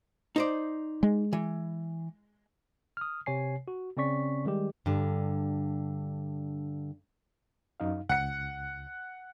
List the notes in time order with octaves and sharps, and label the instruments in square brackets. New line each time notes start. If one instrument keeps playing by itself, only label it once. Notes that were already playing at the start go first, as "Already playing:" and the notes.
[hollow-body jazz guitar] D#4 C5 D5
[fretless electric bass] G#3
[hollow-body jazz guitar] E3
[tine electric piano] D#6 F6
C3 C#5 G#5 C7
F#4
C#3 C4 C#4 D5 C#6 B6
D#3 G3 G#3 G4
[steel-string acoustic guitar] G2 D3
[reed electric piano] F#2 D#4 F5
[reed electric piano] C#2 [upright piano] F#5 C#7